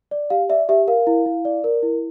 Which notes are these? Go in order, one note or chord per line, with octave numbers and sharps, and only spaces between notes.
D5
G4 F5
D5 E5
G4 E5
A#4 F5
E4
E4
D5
A#4
E4